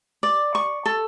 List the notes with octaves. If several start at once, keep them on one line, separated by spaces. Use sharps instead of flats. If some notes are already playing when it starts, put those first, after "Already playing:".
D5
C#6
A4